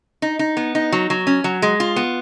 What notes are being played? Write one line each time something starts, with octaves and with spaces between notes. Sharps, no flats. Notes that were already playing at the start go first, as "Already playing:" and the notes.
D#4
D#4
B3
D#4
F#3
F#3
C#4
F#3
G#3
F4
B3